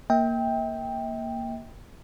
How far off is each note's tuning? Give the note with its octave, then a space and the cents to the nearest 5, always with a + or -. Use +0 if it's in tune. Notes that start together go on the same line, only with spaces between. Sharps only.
A#3 +0 E5 -40 G5 +10